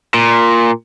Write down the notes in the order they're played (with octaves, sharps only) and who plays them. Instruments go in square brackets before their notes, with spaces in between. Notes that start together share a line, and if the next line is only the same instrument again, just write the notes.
[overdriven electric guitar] A#2